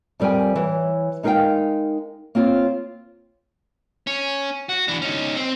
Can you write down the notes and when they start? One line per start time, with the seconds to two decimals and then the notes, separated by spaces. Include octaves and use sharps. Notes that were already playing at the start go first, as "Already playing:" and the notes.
0.20 F2 F3 G3 A#4 G5 G#5
0.56 E3 C#5
1.23 G#3 D#4 A#4 D#5 F5 G5
2.35 A#3 C4 F4 C#5
4.07 C#4
4.69 F#4
4.88 E3 D4
5.02 C#4 D#4
5.36 C4